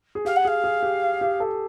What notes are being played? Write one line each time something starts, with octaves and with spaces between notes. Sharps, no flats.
G#4
G4 F5
F#5
G#4 F5
G#4
G4
G4
A4